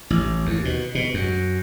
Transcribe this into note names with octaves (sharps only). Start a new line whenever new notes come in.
A1
D#2
B2
B2
F#2